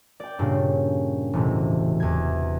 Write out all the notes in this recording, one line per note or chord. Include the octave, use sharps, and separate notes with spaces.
D5 G5
G2 A#2 C#3
E1 A2 C3
E2 G#6